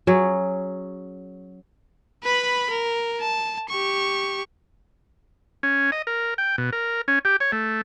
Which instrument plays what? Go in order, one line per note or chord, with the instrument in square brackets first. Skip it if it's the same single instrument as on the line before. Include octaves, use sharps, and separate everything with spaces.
[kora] F#3 C#4 G#4
[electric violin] B4 B5
A#4
A5
G4 C#6
[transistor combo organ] C#4
D#5
A#4
G5
B2
A#4
C#4
G4
C#5
A3